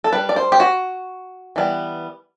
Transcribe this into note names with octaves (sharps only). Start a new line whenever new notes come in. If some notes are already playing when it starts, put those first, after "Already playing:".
A4
G3 D4 B4
D5
C5
G4
F#4
E3 G3 B3